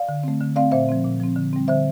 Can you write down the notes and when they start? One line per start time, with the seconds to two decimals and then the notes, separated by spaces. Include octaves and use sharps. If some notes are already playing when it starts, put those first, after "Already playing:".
Already playing: D5 F5
0.09 D3
0.24 A3 C4
0.40 D3
0.56 A3 C4 D5 F5
0.72 A#2 C5 E5
0.89 F3 C4
1.04 A#2
1.20 F3 C4
1.36 D3
1.53 G3 C4
1.68 D3 C5 E5